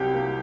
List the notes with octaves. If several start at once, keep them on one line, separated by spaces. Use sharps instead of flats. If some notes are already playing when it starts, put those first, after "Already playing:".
Already playing: C2 C3 F#3 G4
A#3